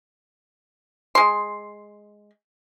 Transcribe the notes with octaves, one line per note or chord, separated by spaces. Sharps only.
G#3 C6